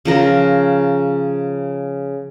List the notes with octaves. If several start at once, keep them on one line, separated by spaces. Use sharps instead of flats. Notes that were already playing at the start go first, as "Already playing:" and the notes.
C#3 F3 A#4